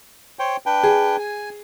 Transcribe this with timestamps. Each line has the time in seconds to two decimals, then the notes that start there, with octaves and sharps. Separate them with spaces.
0.39 C5 C#5 G5
0.66 D4 B4 G5
0.83 G#4
1.20 G#5